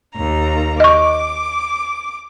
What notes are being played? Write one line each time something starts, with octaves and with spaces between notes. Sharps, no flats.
D#2 A#5
D#5 C#6 D6